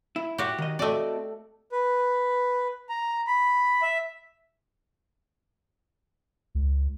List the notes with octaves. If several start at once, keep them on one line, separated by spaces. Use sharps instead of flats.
E4
F#4 G4
D#3 D#5
A3 C4 F#4 D5 D#5
B4
A#5
B5
E5
C#2